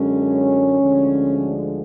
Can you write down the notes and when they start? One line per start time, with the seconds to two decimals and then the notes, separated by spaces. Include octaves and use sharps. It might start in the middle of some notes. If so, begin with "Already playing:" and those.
Already playing: F#2 D3 G#3 C#4
0.81 D2 D3 F3 G#3
1.45 D4